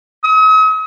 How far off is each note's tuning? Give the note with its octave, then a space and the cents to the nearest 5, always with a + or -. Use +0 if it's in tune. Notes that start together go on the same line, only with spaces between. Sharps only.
D#6 +45